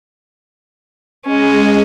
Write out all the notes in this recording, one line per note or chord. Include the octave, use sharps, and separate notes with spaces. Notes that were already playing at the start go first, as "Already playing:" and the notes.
G#3 C#4